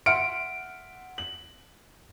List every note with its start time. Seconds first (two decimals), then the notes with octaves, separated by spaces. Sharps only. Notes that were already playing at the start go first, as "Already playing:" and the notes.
0.06 E5 F#5 C6 F6 C#7 D7
1.18 F#7